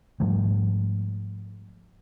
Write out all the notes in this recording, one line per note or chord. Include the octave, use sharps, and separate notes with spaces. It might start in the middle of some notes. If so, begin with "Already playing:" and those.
G#2 F3 G3 A3